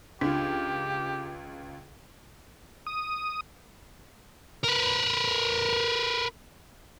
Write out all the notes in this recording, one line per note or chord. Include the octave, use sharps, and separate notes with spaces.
C#2 D4 F4 G4
D#6
A#4 B4